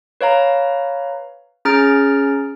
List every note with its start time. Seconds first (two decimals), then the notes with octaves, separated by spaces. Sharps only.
0.21 B4 C#5 F5 A#5
1.65 C#4 G#4 A#5 F6 A6 D7